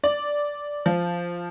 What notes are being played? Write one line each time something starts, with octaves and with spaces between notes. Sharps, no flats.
D5
F3